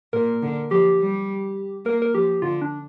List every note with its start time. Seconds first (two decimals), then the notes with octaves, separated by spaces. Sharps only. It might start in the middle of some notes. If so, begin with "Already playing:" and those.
0.13 A#2 A#4
0.43 D3
0.71 F3 G4
1.00 G3
1.85 A#3 A#4
2.02 A#4
2.14 F3 G4
2.42 D3 F4
2.61 D4